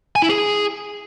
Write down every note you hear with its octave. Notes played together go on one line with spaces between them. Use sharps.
G#5
E4
G#4